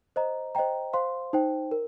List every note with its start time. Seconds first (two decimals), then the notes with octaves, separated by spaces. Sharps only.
0.16 C5 D#5 A#5
0.55 C5 D#5 G5 A#5
0.93 C5 F5 C6
1.33 D#4 C5 G5
1.71 A#4